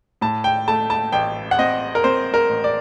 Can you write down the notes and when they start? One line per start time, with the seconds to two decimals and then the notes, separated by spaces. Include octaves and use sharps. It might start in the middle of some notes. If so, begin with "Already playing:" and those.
0.21 A2 A5
0.44 G5
0.68 A3 A5
0.90 A5
1.12 A1 G5
1.51 F#5
1.58 C4 D#5
1.95 A#4
2.04 C4 C5
2.34 A#4
2.49 A1
2.64 D5